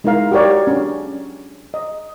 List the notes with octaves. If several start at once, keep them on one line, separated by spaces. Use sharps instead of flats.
G#3 D#4 E4 A#4 F5
F#4 G4 A#4 C#5 D5
C#4 D4
D#5